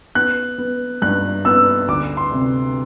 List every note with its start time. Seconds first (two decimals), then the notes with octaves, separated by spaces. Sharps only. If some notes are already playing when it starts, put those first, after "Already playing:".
0.15 B3 F#6
0.58 B3
1.02 G2 F#6
1.45 B3 E6
1.88 D2 D6
2.17 C6
2.32 C3